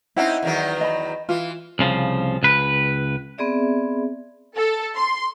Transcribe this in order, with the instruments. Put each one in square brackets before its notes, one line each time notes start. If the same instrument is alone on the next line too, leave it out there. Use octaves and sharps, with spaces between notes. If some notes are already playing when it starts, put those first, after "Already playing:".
[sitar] C4 C#4 D#4 [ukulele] E4 F#5
[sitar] E2 D#3 F#3
[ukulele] D#5 B5
[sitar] E3 [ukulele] F4
[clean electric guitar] C2 C#3 F3
C#2 B4
[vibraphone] B3 C4 G#4 D5 E5
[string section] A4
C6